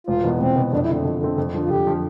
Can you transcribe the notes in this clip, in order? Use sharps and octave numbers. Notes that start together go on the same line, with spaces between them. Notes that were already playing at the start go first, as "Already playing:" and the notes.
E1 F4
E2 B2 B3
E1 C4
E2 B2 B3
F2 D4
E4
D3 A3 C4
F2
D3 A3 C4
F2
D3 F3
F4
F2 G4
D3 F3